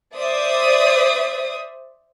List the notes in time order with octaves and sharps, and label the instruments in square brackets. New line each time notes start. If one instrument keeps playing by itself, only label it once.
[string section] C5 D5 E5 D#6